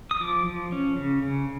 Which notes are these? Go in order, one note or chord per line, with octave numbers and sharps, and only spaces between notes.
D#6
F3 D6
F3
C#4
C#3
C#3